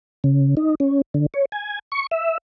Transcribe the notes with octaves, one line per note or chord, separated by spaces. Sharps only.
C#3
D#4
C#4
D3
C#5
G#5
C#6
E5